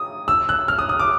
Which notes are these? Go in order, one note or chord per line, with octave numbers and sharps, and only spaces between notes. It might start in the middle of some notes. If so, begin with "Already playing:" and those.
Already playing: D#6
E6
F#6
F6
D#6
D#6
D6